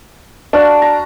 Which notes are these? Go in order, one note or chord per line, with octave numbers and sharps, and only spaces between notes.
D4 F#4 F5 A5
A#5